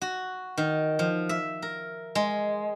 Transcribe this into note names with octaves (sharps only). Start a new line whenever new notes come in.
F#4
D#3
F3
E5
A#4
G#3